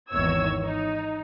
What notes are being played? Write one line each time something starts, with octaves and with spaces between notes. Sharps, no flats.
G#1 E2 D#3 C#5 E6 G#6
D#4